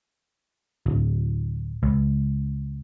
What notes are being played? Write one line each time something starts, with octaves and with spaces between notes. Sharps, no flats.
D1
C#2